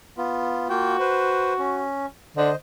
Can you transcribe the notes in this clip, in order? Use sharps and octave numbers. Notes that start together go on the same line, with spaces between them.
B3 F4
A#3 F4 F#4 G5
B4 C5
C#4
D3 C5 D#5